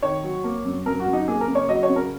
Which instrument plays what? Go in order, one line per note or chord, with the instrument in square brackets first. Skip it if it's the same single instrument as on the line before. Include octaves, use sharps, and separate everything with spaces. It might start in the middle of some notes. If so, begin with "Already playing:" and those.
[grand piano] D#3 C#5
F#3
A#3
F#2
F#2 A#4
F#4
F#2
D#4
A#3 G#4
A#4
C#3
C#5
F#3 D#5
C#5
C#3
A#4